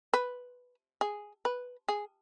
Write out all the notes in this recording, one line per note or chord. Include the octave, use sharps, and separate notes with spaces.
B4
G#4
B4
G#4